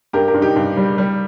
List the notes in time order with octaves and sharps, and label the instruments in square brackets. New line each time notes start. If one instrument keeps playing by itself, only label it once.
[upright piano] G2 G4 A#4
G4 A#4
G2
D#4 G4
G2
G3
G3